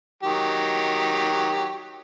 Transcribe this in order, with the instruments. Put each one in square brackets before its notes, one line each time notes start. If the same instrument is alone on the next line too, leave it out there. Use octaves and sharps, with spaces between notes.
[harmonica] D#3 F#3 G4